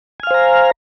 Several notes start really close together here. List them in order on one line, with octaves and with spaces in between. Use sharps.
G#5 F6 F5 C5 A#5